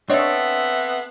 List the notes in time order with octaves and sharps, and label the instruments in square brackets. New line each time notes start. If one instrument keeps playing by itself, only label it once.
[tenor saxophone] B3 [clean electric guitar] C4 A4 [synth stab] D4 C#5 D#5 [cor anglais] E5